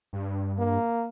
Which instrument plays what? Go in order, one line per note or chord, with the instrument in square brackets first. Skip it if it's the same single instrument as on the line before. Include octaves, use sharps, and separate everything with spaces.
[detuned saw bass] G2
[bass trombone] A#3